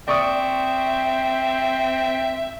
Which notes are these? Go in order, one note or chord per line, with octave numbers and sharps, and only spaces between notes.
C4 D5 E5 C#6 D#6